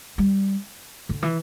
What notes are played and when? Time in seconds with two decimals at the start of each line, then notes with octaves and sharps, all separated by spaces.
0.18 G3
1.09 D3
1.22 E3